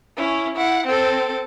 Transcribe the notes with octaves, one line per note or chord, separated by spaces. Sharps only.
C#4 E4
E4 F#5
C4 A4